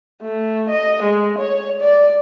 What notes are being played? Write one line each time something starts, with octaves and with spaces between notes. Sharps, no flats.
A3
D#5
G#3
C#5
D5